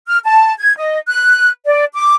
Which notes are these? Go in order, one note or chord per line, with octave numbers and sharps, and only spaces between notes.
F6
A5
G#6
D#5
F#6
D5
D6